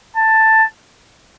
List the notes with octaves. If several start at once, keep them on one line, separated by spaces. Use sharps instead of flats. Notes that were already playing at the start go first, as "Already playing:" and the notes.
A5